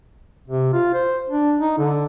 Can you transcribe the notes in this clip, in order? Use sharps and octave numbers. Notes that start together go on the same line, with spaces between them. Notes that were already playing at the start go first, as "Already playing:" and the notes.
C3
F4
C5
D4
D#4
D3